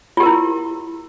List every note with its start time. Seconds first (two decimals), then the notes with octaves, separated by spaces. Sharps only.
0.17 F4
0.20 G4
0.23 A#4
0.26 E4